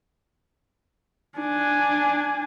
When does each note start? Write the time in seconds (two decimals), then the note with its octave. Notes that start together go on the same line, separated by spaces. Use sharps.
1.38 D4 G#5